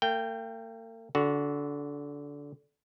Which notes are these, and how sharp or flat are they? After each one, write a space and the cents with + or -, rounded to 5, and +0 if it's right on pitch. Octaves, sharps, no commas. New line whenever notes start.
A#3 -45 G5 +0
D3 -20 F#4 +0